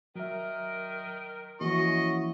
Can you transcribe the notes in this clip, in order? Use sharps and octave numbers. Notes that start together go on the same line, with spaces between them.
D#3 F#3 A#4 E5
E3 F3 A#3 C#4 E4 F#4 D#5 C#6